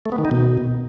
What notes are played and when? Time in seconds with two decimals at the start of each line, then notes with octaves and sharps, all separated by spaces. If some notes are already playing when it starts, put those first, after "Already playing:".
0.06 A3
0.12 B3
0.18 D#3
0.25 D#4
0.31 B2